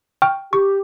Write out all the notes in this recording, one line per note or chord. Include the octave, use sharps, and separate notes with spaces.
G5 C#6 F6
G4 C#6